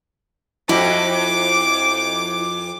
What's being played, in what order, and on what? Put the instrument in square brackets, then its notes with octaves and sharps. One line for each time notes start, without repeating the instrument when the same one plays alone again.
[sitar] F2 [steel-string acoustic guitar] E4 F#4 D#5 [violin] D6